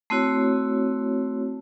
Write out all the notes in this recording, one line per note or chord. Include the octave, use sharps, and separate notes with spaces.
A3 C4 E4 F#4 C#5